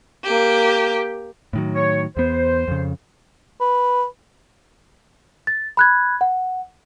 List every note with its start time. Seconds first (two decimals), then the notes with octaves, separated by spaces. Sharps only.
0.24 A#3 G4
1.53 A2 D#3 F#3
1.75 C#5
2.17 E2 B3 C5
2.68 F2 C#3
3.61 B4
5.47 A6
5.77 B5 F#6 G#6
6.21 F#5